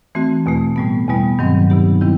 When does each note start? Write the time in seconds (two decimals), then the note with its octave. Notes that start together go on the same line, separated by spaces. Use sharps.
0.15 E3 A3 C4 F#4
0.46 E2 B2 A3
0.76 A2 G3 B3
1.08 E2 B2 G3 B3
1.39 G2 D#3 F#3 C4
1.70 C3 F#3 B3 D#4 G4
2.01 C3 D#3 G3 C4 E4